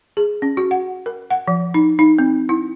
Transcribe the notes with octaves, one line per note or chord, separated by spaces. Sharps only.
G#4
C#4
F#4
F#5
A#4
F#5
F3
D#4
D#4
C4
E4